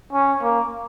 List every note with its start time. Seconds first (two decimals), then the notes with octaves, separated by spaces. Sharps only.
0.13 C#4
0.42 A#3